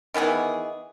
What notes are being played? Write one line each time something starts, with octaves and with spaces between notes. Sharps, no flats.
D#3 E3 B3 G#4